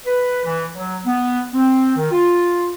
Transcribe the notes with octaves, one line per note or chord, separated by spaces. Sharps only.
B4
E3
F#3
B3
C4
D#3
F4